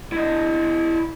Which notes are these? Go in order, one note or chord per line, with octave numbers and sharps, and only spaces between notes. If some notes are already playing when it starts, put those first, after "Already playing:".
E4 D#5